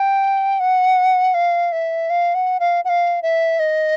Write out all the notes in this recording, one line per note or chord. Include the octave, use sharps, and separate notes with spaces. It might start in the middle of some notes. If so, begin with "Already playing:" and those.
Already playing: G5
F#5
F5
E5
F5
F#5
F5
F#5
F5
E5
D#5